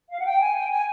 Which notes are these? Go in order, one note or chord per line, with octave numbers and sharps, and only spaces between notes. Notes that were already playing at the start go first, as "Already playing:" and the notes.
F5
F#5
G5
G#5
G5
G#5